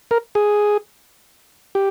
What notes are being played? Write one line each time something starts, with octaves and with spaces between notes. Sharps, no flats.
A#4
G#4
G4